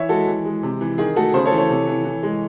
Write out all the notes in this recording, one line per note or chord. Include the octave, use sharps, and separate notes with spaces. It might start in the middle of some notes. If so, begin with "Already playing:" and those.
Already playing: E3 C#5 E5
G#3 F#4 A4
E3
G#3
C3
E3
D#3 G#4
A3 F#4 A4
C#3 G#4 C5
A4 C#5
E3
A4 C#5
C3
E3
E3
G#3